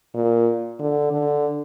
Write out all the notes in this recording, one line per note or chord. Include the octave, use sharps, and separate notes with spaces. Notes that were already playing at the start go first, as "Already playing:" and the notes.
A#2
D3
D3